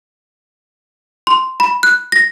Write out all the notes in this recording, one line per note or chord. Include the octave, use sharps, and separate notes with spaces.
C6
B5
F#6
A#6